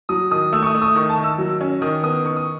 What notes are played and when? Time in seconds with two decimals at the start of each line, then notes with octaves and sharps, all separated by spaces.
0.09 F#3 D#6
0.31 D#3 D#6
0.53 A3 E6
0.63 C#6
0.66 D#6
0.75 A3
0.82 D#6
0.95 D#3 C#6
1.10 A5
1.18 D#3
1.24 E6
1.38 F#3
1.48 E6
1.61 C#4
1.82 D#3 D#6
2.03 B3 D#6
2.25 D#3 C#6
2.36 D#6